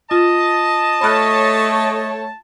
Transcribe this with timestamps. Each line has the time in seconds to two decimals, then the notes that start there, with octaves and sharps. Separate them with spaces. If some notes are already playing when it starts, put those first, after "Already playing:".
0.11 F4 D#5 A5
1.02 A3 C#5 B5 F6 F#6